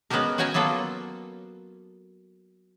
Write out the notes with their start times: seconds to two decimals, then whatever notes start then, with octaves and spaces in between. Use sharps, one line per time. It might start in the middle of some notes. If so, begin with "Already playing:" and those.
0.10 G#3 B3 C#4 F#4 G4 A#4
0.38 C#4 F#4 G5 G#5 A#5
0.54 F#3 A#3 B3 F4 A4